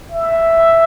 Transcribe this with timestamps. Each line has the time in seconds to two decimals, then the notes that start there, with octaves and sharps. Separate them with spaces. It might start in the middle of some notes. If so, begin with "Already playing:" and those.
0.12 E5